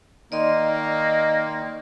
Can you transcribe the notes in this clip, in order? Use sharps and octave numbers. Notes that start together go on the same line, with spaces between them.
D#3 A#3 D#4 D5 D#5 C6